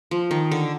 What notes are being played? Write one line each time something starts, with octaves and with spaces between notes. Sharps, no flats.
F3
D#3
D3